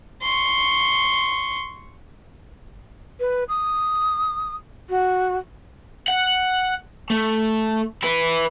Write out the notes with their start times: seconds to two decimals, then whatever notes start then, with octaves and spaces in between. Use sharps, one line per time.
0.23 C6 C#6
3.20 B4
3.48 D#6
4.89 F#4
6.08 F#5
7.10 A3
8.03 E4 B4